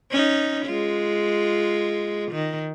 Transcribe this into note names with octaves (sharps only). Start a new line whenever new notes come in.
C#4 D#4
G#3 F4
D#3